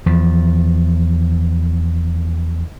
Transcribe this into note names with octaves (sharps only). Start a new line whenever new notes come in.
E2 F3